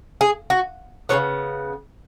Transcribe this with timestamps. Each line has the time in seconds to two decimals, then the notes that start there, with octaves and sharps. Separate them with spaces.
0.21 G#4
0.50 F#4
1.09 C#3 G#3 B3 C#5